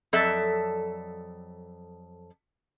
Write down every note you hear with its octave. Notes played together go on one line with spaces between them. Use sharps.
F2 F#3 A4 D5 E5